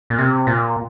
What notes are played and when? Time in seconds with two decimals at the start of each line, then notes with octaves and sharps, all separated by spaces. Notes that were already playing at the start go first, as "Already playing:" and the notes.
0.10 A#2
0.19 C3
0.47 A#2